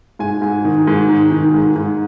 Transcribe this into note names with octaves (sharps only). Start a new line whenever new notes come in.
G#2 G#5
G#2
D#3
G#2
D#3
D#3
G#2
G#2